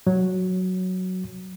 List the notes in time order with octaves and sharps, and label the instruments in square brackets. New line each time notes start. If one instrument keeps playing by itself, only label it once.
[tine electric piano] F#3